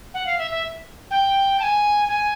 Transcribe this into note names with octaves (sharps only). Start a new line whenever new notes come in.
F#5
F5
E5
E5
G5
A5
G#5
G#5